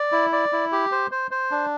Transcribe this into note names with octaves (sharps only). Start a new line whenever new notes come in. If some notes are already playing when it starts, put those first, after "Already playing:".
Already playing: D5
E4
D5
E4
G4
C5
C5
C5
D4